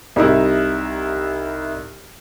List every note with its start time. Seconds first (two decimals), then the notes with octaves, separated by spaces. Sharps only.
0.16 C2 G3 D#4 E4